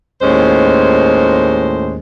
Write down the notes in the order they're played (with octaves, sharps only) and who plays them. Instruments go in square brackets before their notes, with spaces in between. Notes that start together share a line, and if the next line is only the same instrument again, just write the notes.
[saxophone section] D#2 A2 G#3 C#4 C5